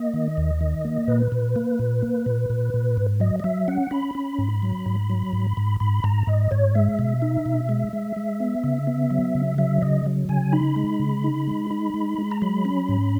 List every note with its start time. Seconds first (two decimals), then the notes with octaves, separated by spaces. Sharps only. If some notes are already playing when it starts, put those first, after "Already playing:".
Already playing: A#3 D#5
0.14 D#3
0.37 D#2
0.61 D#3
0.85 A#3
1.08 A#2 B4
1.32 A#2
1.56 A#3
1.79 A#2
2.02 A#3
2.26 A#2
2.50 A#2
2.74 A#2
2.97 G#2
3.20 F#3 D#5
3.40 D#5
3.44 F#3 E5
3.68 C#4 F#5
3.91 C#4 B5
4.15 C#4
4.39 G#2
4.62 F#3
4.86 G#2
5.10 F#3
5.33 G#2
5.57 G#2
5.80 G#2 B5
6.04 G#2 A#5
6.27 G#2 D#5
6.51 G#2 C#5
6.75 G#3 E5
6.99 B2
7.22 D#4
7.46 B2
7.69 G#3
7.93 G#3
8.16 G#3
8.40 B3
8.64 C#3
8.87 B3
9.11 F#3
9.35 C#3
9.58 F#3 E5
9.82 C#3 D#5
10.06 F#3
10.29 C#3 G#5
10.53 D#4 B5
10.76 G#3
11.00 C#3
11.24 D#4
11.47 G#3
11.71 D#4
11.94 G#3
12.18 G#3
12.31 A#5
12.42 F#3 B5
12.65 C#4
12.89 G#2